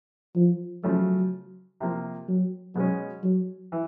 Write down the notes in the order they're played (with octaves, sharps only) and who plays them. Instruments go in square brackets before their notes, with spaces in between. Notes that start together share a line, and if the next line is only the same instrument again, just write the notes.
[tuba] F3
[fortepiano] C#3 F3 A3 [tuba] F#3
[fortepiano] C3 F3 A#3
[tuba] F#3
[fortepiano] B2 G#3 C#4 [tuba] F#3
[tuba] F#3
[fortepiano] E3